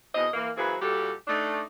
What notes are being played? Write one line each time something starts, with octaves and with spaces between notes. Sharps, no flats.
E2 B2 C4 D#5
E3 A#3
E3 F#3 A#3 C4 G#4 B4
A#2 G3 F#4 G4 A4
A3 D4 D#4